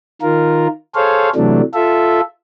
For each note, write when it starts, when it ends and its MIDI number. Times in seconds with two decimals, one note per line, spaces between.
0.22 0.67 51
0.22 0.67 65
0.22 0.67 70
0.95 1.29 68
0.95 1.29 69
0.95 1.29 72
0.95 1.29 73
0.95 1.29 77
1.35 1.61 48
1.35 1.61 52
1.35 1.61 54
1.35 1.61 57
1.35 1.61 62
1.74 2.21 65
1.74 2.21 69
1.74 2.21 76